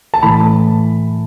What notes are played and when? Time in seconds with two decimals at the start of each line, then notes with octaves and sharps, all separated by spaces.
0.14 A5
0.23 A2 E3 B5